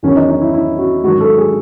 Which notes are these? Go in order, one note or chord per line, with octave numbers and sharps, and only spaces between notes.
E2 D#3 F#3 C#4
D#4
D#4
E4
E4
F#4
G#2 D#3 F#3 F#4
A4
G#4